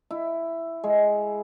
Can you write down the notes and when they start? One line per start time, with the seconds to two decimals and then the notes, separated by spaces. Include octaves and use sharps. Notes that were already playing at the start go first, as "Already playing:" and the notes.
0.11 E4
0.84 G#3